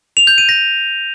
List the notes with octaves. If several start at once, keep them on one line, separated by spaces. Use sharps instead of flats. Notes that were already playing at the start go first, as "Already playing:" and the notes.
F7
G6
D#7
A#6